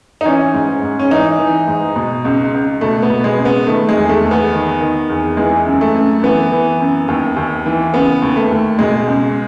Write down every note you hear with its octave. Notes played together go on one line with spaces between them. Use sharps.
D#4
E3 C#4
G#2
G#2
C#4
E3 D#4
E3
G#2
B2
C#2
C#2
B2 A3
B3
B2
G#3
C#2
B3
D#3 A3
G#3
E2
A3
E2
B3
D#3
D#3
E2
E3 G#3
F#2
A3
F#2
E3 B3
E3
F#2
D#2
D#2
E3
C#3 B3
D#2
A3
D#2
B2 G#3
C#2